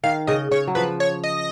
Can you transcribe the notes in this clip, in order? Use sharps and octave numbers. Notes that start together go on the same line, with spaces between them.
D#3 F5
C#3 D#5
C#3 C#5
F#3
F3 B4
C#5
D#5